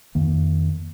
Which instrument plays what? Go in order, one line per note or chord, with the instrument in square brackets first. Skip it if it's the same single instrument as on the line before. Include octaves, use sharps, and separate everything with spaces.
[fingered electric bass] F2 D#3 A#3